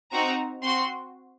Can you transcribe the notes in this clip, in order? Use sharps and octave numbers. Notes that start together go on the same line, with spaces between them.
C4 D#4 F#4 A#5
C4 F#4 C6